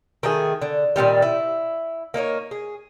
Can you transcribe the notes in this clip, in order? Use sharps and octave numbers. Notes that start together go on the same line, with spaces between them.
D#3 A3 G#4
D3
A#2 D3 D#3 G3
E4
A#3 D#4 A4 C#5
G#4